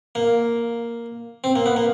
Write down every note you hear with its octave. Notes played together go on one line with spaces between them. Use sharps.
A#3
C4
A#3
B3
A#3